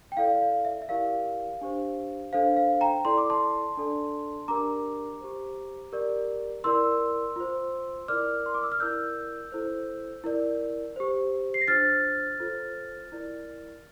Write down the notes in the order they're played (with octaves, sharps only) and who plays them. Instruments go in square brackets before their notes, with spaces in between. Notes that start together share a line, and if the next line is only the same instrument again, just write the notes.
[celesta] G5
E4 A4 D5 F5
F5
E5
E5
E4 G4 A#4 D5 F5
D4 G4 C5
D4 A4 C5 F5
F5
G5 A#5
E4 A4 D5 C6
D6
A5 C6
D4 A4 D5
D4 G4 A#4 D5 A#5 D6
G4 C5
G4 A#4 D5
E4 A#4 D5 C6 E6
F4 C5
E4 A#4 D5 D6 F6
C6
D6
E6
F6
E4 A#4 D5 E6 G6
E4 A4 C5
E4 A#4 D5
G4 C5
C7
A#6
D4 F4 C5 F6 A6
F4 A4 C5
E4 A#4 D5